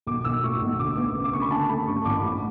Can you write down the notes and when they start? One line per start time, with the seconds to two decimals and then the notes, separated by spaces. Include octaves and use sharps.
0.07 B1 D6
0.25 B1 E6
0.43 A2 C#6
0.62 B1
0.79 D2 D6
0.97 B3 D6
1.15 C#3
1.24 D6
1.33 C#3 C#6
1.42 B5
1.51 D3 A5
1.69 A3 B5
1.87 G2 C#6
2.05 A1 D6
2.23 A2 B5